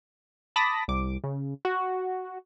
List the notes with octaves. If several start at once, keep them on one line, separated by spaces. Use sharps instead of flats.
A5 B5 D6 D#6 A#6
C2 D6
C#3
F#4